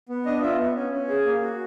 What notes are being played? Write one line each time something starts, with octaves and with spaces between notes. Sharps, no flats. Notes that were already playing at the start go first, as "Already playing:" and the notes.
B3
D4 D#5
F4 E5
B3
C#4
C#4
G#4
A#3
F#4